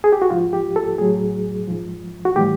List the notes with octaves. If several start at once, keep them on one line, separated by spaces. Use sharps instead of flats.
G#4
G4
F#4
G#2 F3 F4
G4
A4
A2 F#3 G#4
G#2 F3
F#4
A2 E3 G3 G4